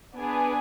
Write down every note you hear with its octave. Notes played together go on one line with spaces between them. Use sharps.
B3 D4 G#4 B4